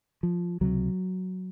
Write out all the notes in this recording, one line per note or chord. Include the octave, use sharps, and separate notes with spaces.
F3
C#2 C3 F#3